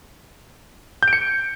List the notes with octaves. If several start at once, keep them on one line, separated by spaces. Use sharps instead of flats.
G6
D7
C#7